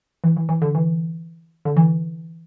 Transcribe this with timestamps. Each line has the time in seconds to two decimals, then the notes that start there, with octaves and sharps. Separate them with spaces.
0.24 E3
0.37 E3
0.49 E3
0.62 D3
0.75 E3
1.65 D3
1.77 E3